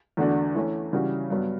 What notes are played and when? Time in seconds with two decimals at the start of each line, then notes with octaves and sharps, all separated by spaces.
0.17 E2 D3 A3 D4 F#4
0.55 E3 A3 C#4
0.93 C#3 E3 G3 C#4 F#4
1.30 G2 F#3 B3